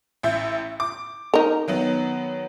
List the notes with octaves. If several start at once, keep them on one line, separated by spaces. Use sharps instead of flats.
A1 E5 G6
D6
D#4 A#4
D#3 F#3 B3